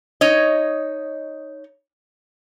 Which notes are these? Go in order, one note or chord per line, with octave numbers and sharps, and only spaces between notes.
D#4 C#5 D#5